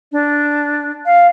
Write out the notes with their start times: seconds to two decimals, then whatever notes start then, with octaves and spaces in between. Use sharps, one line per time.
0.12 D4
1.05 F5